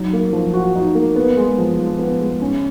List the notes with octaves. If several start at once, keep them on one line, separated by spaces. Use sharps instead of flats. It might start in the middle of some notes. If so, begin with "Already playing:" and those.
Already playing: F#3 D#4
A#3
F3
F#4
D#4
A#3
B3
G#3
F3
F3
B3
G#3
C#4